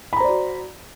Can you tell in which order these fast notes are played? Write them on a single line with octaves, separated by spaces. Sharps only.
B5 A#5 C5 D5 F#4